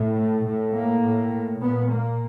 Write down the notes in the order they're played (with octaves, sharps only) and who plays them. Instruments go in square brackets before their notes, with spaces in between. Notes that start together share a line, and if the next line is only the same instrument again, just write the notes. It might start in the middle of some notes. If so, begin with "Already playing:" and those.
Already playing: [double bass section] A2
A3
A2
A#3
A2
A#2 B3
A#3